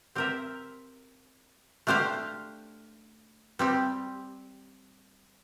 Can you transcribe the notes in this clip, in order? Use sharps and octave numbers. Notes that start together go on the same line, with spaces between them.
C4 G4 A#4 E5
A3 D4 G4 C5 F5
G3 C4 G4